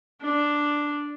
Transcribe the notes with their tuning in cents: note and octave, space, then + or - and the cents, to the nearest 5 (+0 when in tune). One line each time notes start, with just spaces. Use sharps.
D4 +0